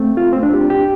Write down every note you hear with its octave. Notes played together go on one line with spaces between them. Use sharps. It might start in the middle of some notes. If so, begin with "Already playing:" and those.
Already playing: A3 C4
F4
C4
D4
G4
G4